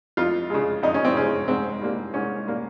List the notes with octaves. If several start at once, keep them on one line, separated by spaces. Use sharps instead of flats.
F2 F4
C#3 G#3
F2 D#4
C#4
C4
C#3 G#3 C#4
G#2 C4
G3 A#3
G#2 C#4
G3 A#3